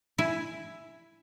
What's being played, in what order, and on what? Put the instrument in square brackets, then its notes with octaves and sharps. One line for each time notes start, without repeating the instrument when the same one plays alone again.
[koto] E4 E5 G#5